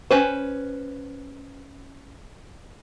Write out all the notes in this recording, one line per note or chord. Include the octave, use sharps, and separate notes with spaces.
C#4 B4 C5